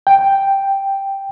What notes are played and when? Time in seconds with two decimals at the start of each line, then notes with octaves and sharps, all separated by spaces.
0.07 G5